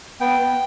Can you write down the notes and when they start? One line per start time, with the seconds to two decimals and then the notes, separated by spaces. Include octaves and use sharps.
0.21 B3 G5
0.39 B3